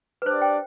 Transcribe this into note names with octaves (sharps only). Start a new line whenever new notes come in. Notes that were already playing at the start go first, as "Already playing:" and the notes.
B4
D4 G4 C5 D5
G5